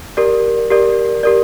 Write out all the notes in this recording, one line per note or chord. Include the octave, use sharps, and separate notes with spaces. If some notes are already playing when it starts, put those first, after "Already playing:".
G4 A#4 D5
G4 A#4 D5
G4 A#4 D5